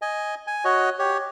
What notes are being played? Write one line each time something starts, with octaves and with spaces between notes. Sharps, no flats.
D#5 G#5
G#5
F#4 C#5 D#5
G4 C#5